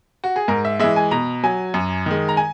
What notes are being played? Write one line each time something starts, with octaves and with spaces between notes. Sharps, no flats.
F#4
G#4
G#2 A#4
E5
E3 G#3 E5
G#5
B2 A#5
F#3 G#5
F#2
D#3 G#3
A#5
G#5